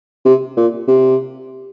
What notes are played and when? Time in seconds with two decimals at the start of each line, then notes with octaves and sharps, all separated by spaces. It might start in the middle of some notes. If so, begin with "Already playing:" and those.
0.25 C3
0.57 A#2
0.88 C3